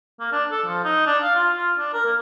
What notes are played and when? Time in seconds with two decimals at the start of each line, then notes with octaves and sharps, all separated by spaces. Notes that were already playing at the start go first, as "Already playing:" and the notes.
0.20 A#3
0.32 D4
0.52 A4
0.66 F3
0.84 D#4
1.06 D4
1.23 F5
1.35 F4
1.56 F4
1.78 D4
1.93 A#4
2.06 A#3